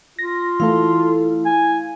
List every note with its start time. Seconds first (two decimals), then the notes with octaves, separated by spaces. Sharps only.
0.19 F4 A#6
0.60 E3 A3 E4 A4 F5
1.45 G#5